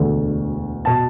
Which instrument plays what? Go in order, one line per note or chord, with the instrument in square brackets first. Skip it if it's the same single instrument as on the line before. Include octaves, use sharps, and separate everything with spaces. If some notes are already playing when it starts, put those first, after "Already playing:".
Already playing: [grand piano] E1 D2 D3
B2 A5